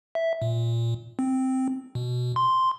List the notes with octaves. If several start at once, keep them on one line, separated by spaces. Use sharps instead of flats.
E5
A#2
C4
B2
C6